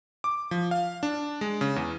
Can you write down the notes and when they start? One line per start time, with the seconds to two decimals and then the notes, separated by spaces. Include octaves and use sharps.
0.24 D6
0.51 F3
0.71 F5
1.03 D4
1.41 G#3
1.61 C#3
1.76 E2